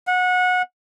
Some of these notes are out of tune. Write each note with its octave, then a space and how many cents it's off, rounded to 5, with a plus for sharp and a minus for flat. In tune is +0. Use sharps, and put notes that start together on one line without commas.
F#5 -25